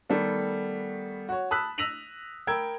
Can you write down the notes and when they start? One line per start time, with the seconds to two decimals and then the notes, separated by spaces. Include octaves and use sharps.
0.09 D#3 G3 A3 B3 A4
1.29 F#4 C#5
1.51 A5 B5 D#6 E6 F#6 B6
1.78 E6 A#6 B6 D#7 F7 F#7
2.47 A#4 G5 B5 E6 G#6